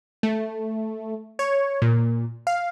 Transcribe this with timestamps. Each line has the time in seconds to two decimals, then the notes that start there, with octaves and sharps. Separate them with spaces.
0.23 A3
1.39 C#5
1.82 A#2
2.47 F5